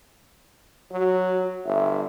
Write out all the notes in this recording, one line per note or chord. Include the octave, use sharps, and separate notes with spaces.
F#3 F#4
G1 E5